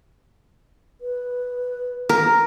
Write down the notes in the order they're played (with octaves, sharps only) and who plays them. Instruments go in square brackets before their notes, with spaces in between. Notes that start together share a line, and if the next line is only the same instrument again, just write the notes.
[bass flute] B4
[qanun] A#4